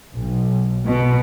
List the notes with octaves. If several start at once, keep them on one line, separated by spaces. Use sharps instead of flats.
B1
B2